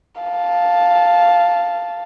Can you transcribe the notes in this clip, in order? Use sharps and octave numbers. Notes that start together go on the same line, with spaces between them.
F5 A5